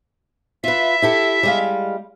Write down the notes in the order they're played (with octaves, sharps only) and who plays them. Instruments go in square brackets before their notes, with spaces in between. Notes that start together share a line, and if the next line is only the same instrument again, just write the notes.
[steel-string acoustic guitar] F4 B4 [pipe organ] E5
[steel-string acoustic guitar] E4 G4 A4
G3 G#3 F5